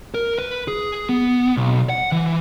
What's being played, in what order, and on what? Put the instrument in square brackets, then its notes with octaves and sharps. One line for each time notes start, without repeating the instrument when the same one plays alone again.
[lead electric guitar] A#4
B4
G#4
B3
B1
F#5
E3